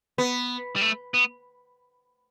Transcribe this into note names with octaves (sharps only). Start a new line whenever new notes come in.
B3
G3
A3
B3